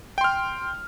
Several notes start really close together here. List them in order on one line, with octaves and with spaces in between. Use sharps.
G5 C6 F6